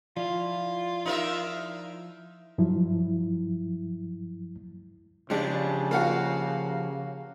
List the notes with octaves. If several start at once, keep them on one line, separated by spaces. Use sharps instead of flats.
F3 E4 F4 D5 F5
D#4 A#4 E5
G2 F3 F#3 E4
C#3 F3 G#3 D4 G4
A#3 F4 F#4